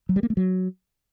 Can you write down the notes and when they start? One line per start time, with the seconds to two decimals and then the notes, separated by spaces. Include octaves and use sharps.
0.09 F#3
0.16 G3
0.23 A#3
0.30 A3
0.37 F#3